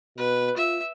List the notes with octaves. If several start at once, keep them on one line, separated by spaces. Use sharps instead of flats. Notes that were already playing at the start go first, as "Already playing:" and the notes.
B2 B4
F4 E5